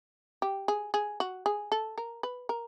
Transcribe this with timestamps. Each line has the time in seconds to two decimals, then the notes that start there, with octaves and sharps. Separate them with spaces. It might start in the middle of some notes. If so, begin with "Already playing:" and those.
0.42 G4
0.68 G#4
0.94 G#4
1.20 F#4
1.46 G#4
1.72 A4
1.98 A#4
2.23 B4
2.49 A#4